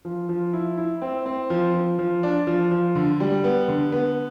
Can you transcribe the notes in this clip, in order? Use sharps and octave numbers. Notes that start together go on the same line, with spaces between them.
F3
F3
E4
E4
C4
C4
F3
F3
F3
D4
F3
F3
D3
G3
B3
D3
B3